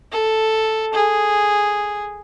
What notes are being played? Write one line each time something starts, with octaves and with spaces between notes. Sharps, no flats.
A4
G#4